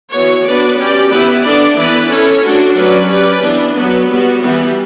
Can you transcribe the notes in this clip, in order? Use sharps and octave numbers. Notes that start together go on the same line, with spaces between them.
E3 B3 F#4 C#5
B3 D4 F#4 B4 D5
C#4 G4 D5
E3 B3 E4 G4 B4
B3 D4 A4 D5
E3 B3 E4 B4 D5
C#4 E4 A4 C#5
A3 D4 F#4
F#3 C#4 F#4 B4 D5
C#4 G4 B4 D5
E3 B3 D4
F#3 B3 F#4 B4
G3 B3 F#4
E3 G3 B3